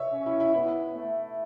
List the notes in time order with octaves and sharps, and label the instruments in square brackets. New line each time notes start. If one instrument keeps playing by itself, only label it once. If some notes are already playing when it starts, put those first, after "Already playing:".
Already playing: [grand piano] C#5 E5
[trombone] C#4
[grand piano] E4
E4
[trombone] B3 [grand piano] E4
[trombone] A3